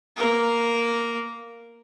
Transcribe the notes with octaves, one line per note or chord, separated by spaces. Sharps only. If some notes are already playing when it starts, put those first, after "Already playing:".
A#3 A#4